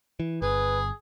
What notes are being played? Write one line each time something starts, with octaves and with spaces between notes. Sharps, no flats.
E3
G1 G#4 B4